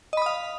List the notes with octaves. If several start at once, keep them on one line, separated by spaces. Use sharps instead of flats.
D#5 F5 B5 D#6